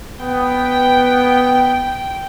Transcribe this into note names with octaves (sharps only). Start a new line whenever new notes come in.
B3 G5